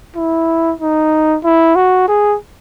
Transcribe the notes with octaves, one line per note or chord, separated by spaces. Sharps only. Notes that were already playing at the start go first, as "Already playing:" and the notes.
E4
D#4
E4
F#4
G#4